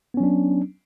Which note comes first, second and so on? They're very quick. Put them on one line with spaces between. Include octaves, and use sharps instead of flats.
B3 C#4 F#3 D4